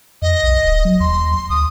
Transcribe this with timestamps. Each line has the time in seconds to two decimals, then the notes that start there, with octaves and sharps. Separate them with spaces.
0.22 F2 D#5
0.43 B1
0.65 D1
0.85 F#3
1.00 D#2 C6
1.50 D2 D#6